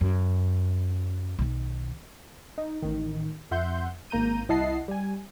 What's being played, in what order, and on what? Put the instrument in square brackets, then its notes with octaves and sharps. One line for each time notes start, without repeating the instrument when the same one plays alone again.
[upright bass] F#2
B1 D#3
[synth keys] D#4
A1 D#3
F2 E5 F#5 C6 G6
G#1 A#3 A#5 G6 D#7
C2 E4 D#5 F#5 A5 C7
G3 G#5